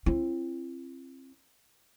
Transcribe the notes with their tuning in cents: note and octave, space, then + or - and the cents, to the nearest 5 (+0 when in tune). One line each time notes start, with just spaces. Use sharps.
C4 +30 E4 +40